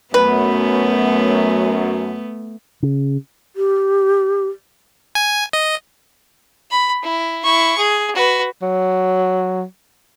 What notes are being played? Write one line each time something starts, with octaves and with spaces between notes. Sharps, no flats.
F#2 A3 B3 B4
C#3
G4
G#5
D#5
B5
E4
E4 C#6
G#4
F#4 B4
F#3